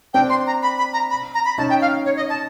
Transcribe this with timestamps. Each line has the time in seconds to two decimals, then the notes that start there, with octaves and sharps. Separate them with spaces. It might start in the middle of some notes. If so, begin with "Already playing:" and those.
0.14 C4 D4 G5
0.30 C6
0.47 A#5
0.63 B5
0.78 B5
0.93 A#5
1.10 B5
1.34 A#5
1.45 B5
1.58 C#4 D#4 A5
1.70 G5
1.81 F5
2.05 C#5
2.17 D#5
2.30 A5